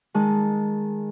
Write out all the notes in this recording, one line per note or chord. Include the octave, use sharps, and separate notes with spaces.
D#3 G#3 A5